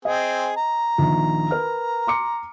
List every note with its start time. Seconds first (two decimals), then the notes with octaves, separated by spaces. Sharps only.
0.05 C4 G#4 D#5
0.57 A#5
0.98 A#1 D#3
1.51 A#4 B4 F6
2.07 C6 D6 C#7